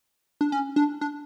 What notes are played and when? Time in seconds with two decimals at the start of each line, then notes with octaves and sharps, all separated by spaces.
0.41 D4
0.52 C#4
0.76 D4
1.01 D4